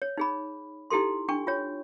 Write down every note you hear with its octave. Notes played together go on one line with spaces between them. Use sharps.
C#5
D#4 G#4 B5
D#4 E4 G4 A4 C6
D4 G5 C#6
F4 C#5